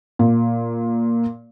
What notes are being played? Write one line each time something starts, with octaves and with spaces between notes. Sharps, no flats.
A#2